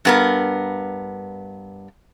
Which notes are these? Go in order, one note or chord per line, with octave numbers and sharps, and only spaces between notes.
G2 B3 A#4